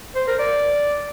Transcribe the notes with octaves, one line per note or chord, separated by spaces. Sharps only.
C5
A#4
D5